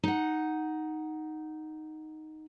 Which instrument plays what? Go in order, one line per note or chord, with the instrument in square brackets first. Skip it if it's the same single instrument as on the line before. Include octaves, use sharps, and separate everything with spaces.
[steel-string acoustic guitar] D#4 F#5